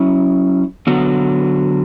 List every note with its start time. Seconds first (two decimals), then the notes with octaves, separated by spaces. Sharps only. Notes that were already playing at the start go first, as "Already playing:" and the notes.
Already playing: F#3 C#4 E4
0.87 D3 F#3 B3 F#4